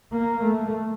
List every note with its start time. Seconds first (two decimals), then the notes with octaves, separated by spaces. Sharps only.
0.12 A#3
0.43 A3